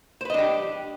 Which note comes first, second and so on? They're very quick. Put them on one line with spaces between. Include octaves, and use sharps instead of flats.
C5 B4 D#5 D4 G4